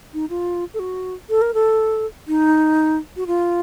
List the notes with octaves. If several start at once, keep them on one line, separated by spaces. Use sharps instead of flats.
D#4
F4
A4
F#4
A4
A#4
A4
D#4
F#4
F4